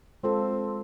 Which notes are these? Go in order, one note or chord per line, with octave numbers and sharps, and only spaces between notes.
G#3 C4 F4 A4